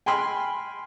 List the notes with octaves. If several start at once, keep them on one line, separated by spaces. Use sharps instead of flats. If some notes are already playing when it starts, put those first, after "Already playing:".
G5 G#5 B5 C6 F6